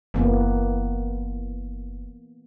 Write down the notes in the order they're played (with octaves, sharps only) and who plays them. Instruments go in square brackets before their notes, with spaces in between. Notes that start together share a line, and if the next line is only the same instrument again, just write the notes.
[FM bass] F#1 [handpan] E3 A#3 B3